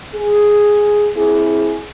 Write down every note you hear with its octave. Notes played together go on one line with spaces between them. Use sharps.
G#4
C4 E4 G#4